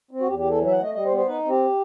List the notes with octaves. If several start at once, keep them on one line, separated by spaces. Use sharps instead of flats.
C4
F#4
E2 G4
G4
E3 A4
F#3
E5
F#5
A3 D#5
G3 D#5
C5
B3
C5
D#4 B4
C4
G4